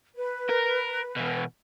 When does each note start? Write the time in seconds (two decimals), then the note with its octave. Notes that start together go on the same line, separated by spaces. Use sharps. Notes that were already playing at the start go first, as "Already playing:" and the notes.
0.15 B4
0.49 A#4
1.16 B2 E3